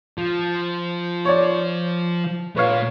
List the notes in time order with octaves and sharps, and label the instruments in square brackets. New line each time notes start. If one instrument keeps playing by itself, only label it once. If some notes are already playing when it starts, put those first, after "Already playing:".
[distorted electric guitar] F3
[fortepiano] C#5 D5
[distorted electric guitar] A#2 [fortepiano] B4 C#5 F5